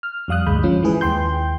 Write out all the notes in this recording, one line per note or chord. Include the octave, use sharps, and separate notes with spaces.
F6
F2 G3 F5 D#6 F#6
G1 D2 G2 G#3 B5 G6
F3 C#4 F4
E3 G#3 E4 G#4 B4
D#2 G5 C6 G6